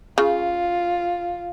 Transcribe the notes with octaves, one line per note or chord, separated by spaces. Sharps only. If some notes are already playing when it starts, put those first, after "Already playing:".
C#3 F4